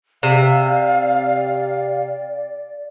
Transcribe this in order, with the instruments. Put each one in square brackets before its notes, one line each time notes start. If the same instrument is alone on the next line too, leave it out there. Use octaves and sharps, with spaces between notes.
[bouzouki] C3 [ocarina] D5 [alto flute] F5